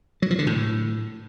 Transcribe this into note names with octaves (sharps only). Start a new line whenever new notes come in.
F#3
F3
D3
A2